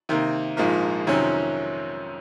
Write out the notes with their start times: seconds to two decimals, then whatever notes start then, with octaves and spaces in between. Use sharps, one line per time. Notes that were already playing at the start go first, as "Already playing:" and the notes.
0.09 C3 D#3 A#3
0.57 A#1 G#2 F3 A#3
1.07 F2 C3 D#3 F#3 C#4